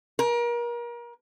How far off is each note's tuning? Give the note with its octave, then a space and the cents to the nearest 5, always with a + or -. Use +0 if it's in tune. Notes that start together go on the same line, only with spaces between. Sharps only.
A#4 +35